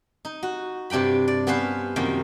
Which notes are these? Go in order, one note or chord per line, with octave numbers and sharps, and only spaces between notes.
D#4
F#4
G2 C3 D4 G5 B5
D5
B3 C#4 B4 C5 F5
F#2 C3 D#3 F3 A#3